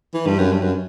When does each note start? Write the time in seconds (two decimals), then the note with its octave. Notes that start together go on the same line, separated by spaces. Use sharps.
0.14 E3
0.26 G2
0.39 F#2
0.52 G2
0.61 F#2